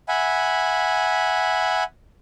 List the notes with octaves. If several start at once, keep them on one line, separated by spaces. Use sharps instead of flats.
E5 F#5 G#5 B5